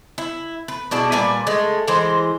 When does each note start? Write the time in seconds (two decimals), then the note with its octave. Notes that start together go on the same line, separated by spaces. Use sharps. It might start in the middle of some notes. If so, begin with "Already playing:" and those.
0.18 E4
0.68 B4
0.91 B2 D4 E4 G#4
1.12 A#2 G3 B4 G#5
1.47 G#3 A3
1.88 E3 G#3 C5